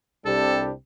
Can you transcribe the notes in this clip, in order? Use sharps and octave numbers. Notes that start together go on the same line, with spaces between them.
C2 C3 G3 D4 G4 A4